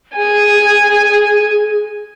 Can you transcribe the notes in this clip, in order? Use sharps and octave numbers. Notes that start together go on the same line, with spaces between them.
G#4 G#5